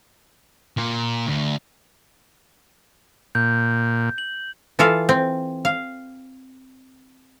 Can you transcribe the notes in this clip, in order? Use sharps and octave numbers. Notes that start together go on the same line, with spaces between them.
A#2
D2
A#2 G6
F#7
E3 F4 A4 E5 F5
C4
F5